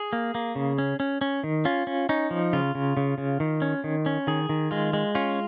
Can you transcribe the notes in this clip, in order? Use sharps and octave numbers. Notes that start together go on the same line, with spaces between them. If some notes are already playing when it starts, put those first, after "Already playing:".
Already playing: G#4
A#3
A#3
C#3
C#4
C#4
C#4
D#3
C#4 F4
C#4
C#4 D#4
F3
C#3 F4
C#3
C#3
C#3
D#3
C#4
D#3
C#4
D#3 G#4
D#3
G#3 F4
G#3
C#4 F4